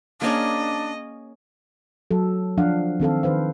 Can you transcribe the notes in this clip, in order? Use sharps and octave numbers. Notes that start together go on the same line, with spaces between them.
A#3 C#4 D4 G#4 D#5
F#3 A4
F3 D4 F5 F#5
D#3 C4 A4 F5
D#3 B4 C5 F5